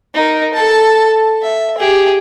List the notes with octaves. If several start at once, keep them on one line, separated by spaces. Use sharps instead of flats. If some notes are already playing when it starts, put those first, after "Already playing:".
D#4 A#4
A4 A5
E5
G4 G#4